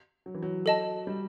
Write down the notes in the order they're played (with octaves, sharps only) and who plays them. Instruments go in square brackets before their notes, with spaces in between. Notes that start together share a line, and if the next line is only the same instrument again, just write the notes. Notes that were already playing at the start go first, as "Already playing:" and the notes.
[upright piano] F#3
E3
F#3
[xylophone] A4 D#5 A5
[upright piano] G3